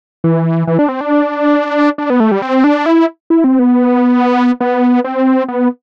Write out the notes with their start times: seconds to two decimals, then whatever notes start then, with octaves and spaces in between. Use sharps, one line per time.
0.24 E3
0.67 E3
0.79 D4
0.89 C4
1.01 D4
1.98 D4
2.10 B3
2.20 A3
2.31 G3
2.42 C4
2.64 D4
2.86 E4
3.30 E4
3.44 C4
3.59 B3
4.61 B3
5.04 C4
5.48 B3